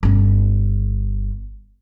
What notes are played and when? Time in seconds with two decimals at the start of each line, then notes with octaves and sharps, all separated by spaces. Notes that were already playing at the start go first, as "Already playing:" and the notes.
0.03 G1 C#4